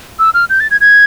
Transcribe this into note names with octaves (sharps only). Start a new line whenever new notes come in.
E6
F6
G6
A6
G#6
G#6